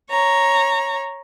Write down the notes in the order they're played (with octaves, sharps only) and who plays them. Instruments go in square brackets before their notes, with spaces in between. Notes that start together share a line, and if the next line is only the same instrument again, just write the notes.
[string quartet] C#5 A#5